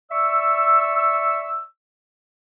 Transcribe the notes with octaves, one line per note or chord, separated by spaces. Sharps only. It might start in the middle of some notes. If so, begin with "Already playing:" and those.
D5 E5 C#6 E6